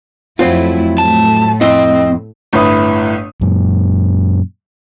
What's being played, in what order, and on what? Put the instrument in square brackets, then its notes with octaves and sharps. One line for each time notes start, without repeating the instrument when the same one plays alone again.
[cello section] F2 A3 E4 [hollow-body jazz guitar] F#3 C4 F4
[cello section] A2 A3 [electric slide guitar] A5
[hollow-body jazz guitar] F2 E4 [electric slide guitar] C4 [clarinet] D#5
[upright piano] G1 A2 E4 B4 D#6
[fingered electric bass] F#2 A#2